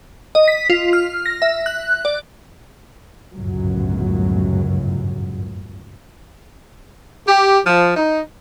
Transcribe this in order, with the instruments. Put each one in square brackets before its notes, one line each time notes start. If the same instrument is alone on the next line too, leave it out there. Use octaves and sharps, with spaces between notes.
[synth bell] D#5
B6
F4
F6
A#6
E5
F#6
D5
[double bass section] G1 C#2 F#2 A2 F#3
[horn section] G4
F3
D#4